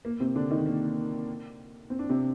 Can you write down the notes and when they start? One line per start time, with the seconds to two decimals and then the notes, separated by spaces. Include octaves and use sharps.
0.05 A#3
0.20 C3 C4
0.36 D3 D4
0.51 D#3 D#4
0.66 A#3
1.90 C4
1.99 D4
2.09 C3 C4